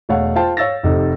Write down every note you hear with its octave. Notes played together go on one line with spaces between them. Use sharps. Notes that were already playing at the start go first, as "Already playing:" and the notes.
E1 A3 C#5 F5 F#5
F4 C5 F5 G5 A5
C#5 F5 E6 A6 A#6
F1 C3 D#4